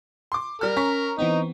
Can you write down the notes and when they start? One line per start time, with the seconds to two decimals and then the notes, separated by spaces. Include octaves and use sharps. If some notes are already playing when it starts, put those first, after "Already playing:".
0.32 C6 D6
0.61 G3 A#4 F6
0.77 C#4 A#5 C#6 B6
1.19 E3 B3 C4 D#4